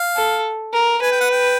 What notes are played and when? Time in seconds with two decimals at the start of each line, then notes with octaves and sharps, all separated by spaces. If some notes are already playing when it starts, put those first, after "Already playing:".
Already playing: F5
0.16 A4
0.73 A#4
1.02 B4 G#5
1.12 G5
1.21 F#5
1.31 G5